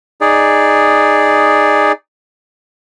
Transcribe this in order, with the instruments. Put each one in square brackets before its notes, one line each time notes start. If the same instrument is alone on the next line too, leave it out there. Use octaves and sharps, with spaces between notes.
[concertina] D#4 G#4 D5